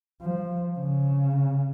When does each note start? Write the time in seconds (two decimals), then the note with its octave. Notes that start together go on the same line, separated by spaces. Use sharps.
0.21 F3
0.79 C#3